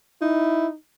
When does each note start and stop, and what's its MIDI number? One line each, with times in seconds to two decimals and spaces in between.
0.22 0.75 63
0.22 0.68 64